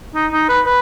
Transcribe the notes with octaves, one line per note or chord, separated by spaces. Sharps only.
D#4
D#4
B4
B4